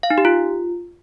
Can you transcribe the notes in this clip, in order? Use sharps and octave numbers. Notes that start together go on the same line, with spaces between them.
F5
D#4
G4
F4